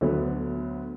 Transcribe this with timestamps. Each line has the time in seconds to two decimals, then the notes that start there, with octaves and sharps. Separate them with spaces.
0.01 D2 D3 F#3 B3